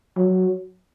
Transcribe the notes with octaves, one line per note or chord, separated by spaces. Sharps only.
F#3